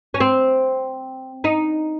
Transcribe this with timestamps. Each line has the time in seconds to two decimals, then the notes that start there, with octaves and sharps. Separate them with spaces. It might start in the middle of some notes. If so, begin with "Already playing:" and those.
0.14 C#4
0.20 C4
1.44 D#4